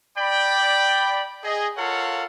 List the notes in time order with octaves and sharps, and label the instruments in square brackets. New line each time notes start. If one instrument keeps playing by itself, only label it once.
[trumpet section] D5 G5 B5
G#4 D#5
F4 A4 A#4 C#5 F5 F#5